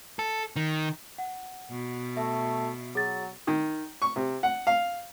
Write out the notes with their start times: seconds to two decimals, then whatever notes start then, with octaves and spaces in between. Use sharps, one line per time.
0.19 A4
0.56 D#3
1.18 F#5
1.70 B2
2.17 A3 E5
2.95 F#3 G#4 A6
3.47 D#3
4.02 C#6
4.16 C3
4.43 F#5
4.67 F5